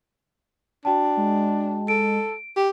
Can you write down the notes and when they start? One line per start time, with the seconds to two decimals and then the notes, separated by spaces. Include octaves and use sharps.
0.85 D4 F#4 G5 A5
1.17 G#3
1.88 A4 D7
2.57 G4